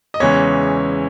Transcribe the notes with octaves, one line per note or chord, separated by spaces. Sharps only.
D#5
E2 C#3 E3 G#3 C#5